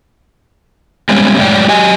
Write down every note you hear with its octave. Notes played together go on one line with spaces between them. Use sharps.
G3 G#3 B3 C#4
F#2 A2 G#3 C#5 D5 G5
F#3 G4 D#5 G#5